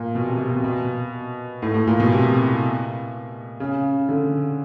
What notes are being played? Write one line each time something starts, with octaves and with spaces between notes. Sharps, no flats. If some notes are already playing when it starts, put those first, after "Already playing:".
Already playing: A#2
B2
C3
C3
B2
B2
A2
A2
A#2
B2
C3
C#3
D3